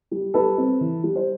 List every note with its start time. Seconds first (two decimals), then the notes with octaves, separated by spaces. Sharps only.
0.11 G3
0.34 G3 A4 B4
0.58 C4
0.81 E3
1.04 G3
1.16 C5